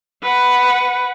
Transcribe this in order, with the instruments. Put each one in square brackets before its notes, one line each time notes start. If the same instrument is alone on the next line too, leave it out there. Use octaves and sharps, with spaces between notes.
[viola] B4 F#5